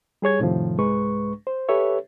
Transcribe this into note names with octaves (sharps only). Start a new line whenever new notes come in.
G3 G#4 C#5 G#6
F2 A2 C3 D#3 F3
C2 G#2 G#3 B4 C#6
C5
G4 A4 B4 C#5 E5